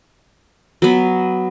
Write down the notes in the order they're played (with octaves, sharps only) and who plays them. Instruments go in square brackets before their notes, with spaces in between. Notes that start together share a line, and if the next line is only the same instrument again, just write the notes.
[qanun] F#3 B3